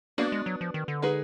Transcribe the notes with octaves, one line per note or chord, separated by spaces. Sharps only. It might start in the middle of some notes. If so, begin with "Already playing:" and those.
A#3 B3 D4 F#4
G#3
F#3
F3
D#3
D3
G#3 D#4 G#4 B4